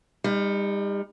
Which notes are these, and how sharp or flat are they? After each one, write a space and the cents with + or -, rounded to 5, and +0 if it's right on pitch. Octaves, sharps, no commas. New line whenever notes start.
G3 +35 D#4 +0